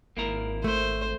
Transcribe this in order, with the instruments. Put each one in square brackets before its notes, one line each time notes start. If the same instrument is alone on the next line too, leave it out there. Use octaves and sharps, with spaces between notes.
[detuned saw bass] G#1 [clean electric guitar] A#3 E4 A#4
[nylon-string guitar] A3 [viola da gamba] C5